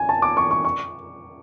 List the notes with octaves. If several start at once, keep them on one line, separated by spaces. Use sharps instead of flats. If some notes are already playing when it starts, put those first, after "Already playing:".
Already playing: G#5
A5
D6
C#6
C#6
C#6